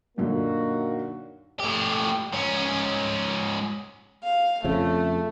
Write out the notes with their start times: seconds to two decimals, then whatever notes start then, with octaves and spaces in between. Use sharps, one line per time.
0.18 F#2 A#2 D3 A#3 D#4 F#4
1.60 A2 G4
2.32 G#2 C#4
4.24 F5
4.65 F2 C#3 A3